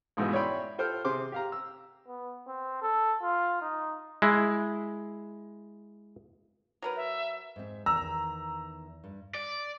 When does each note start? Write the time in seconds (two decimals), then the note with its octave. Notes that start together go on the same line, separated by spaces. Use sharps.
0.17 F2 G#2 B2 E3
0.33 C#5 D5 E5 G5 B5 C6
0.78 F4 A4 C5 F5 G5 F6
1.05 C3 C4 G#4 C5 C6 D6
1.32 G4 F5 A#5
1.52 E6
2.08 B3
2.47 C4
2.82 A4
3.23 F4
3.62 D#4
4.22 G#3 E4
6.82 F#3 A#4 B4
6.96 E5
7.56 G#2 C4
7.86 E2 D#3 A#5 E6
9.04 G2
9.35 D5